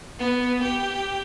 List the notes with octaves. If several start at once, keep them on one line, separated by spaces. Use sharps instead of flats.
B3
G4